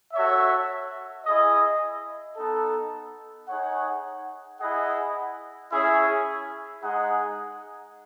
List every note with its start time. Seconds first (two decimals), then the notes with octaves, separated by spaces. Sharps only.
0.13 F#4 A4 C#5 E5
1.26 E4 G#4 D#5
2.37 B3 D#4 A4
3.48 D#4 G#4 C#5 F#5
4.60 E4 G#4 D#5 F#5
5.71 C#4 E4 G#4 C#5 E5
6.83 G#3 D#4 G#4 D#5 F#5